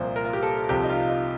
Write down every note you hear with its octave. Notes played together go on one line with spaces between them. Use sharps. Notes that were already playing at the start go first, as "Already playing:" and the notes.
Already playing: C2 A#2 F3 C5
A#4
F4
G4
A4
C2 C3 F3 G4
D#4
F4
D#4